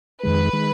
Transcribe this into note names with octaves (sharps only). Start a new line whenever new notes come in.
F2 D#3 G#3 B4
D#3 G#3